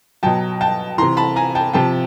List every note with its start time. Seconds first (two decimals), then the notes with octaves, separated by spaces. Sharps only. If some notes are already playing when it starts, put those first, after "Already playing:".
0.23 B2 F#3 G5 A5
0.61 G5 A5
0.98 C3 E3 A#5 C6
1.17 A5 B5
1.36 G#5 A#5
1.55 G5 A5
1.73 C3 F3 G5 A5